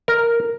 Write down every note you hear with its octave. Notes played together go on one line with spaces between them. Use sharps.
A#4